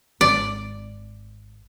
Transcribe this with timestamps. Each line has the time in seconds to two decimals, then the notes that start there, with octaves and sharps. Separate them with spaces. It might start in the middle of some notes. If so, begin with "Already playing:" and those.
0.21 G#1 D5